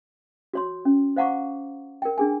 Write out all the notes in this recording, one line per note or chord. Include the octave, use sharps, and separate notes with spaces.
F#4 C#5 C6
C#4
C5 F5 F#5 A#5 C#6 D6
A#4 G5
D4 G#4 G#5